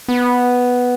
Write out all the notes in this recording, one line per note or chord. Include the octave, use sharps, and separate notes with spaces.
B3